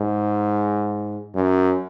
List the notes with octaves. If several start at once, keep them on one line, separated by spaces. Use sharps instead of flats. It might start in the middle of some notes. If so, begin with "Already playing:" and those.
Already playing: G#2
F#2